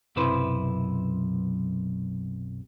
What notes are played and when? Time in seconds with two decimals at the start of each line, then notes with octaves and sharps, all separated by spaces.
0.16 B1 F#2 C3 E4 B4 C5